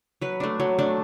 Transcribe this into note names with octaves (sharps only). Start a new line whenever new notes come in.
F#3 B4
A3 D4
F#3
A3 D4